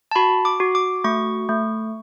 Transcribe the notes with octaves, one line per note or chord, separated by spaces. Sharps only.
A5
F#4 B5
D6
F#4
D6
A3 C#6
A3